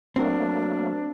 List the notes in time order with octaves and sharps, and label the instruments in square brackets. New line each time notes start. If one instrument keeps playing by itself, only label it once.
[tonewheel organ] F#3 A3 A#3 [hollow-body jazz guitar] C4 F#4 A#4 [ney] D4